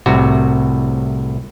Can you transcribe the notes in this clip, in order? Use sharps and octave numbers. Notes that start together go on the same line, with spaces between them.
C2 A2 C3 F#4